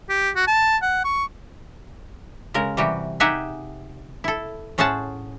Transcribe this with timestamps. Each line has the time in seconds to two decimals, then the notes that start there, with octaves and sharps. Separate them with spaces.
0.09 G4
0.36 F#4
0.47 A5
0.82 F#5
1.04 C#6
2.54 C#3 G#3 A#4
2.77 C3 E3 G3 F#4 G4
3.20 D#4 G4 G#4 E5 F#5 G#5
4.24 E4 A4
4.78 A2 C#4 G#4 C5 F#5 A5